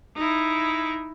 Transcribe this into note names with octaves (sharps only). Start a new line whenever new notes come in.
D#4 E4